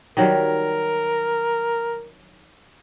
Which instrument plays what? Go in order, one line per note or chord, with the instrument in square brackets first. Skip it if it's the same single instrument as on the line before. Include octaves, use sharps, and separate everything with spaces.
[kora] D#3 F#3 G3 [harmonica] A#4